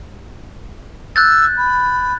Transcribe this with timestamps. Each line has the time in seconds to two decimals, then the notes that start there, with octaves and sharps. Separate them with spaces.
1.16 E6 F#6 G6 A6
1.57 B5